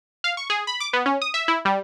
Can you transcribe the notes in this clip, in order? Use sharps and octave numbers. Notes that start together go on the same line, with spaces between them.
F5
C#6
G#4
B5
D6
B3
C#4
D#6
E5
E4
G3